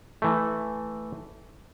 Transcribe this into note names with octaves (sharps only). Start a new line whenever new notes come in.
E3 A3